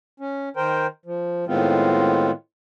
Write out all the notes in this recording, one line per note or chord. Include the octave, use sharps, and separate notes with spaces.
C#4
D#3 A#4 C5 G5
F3
A2 D#3 G#3 B3 C4 F4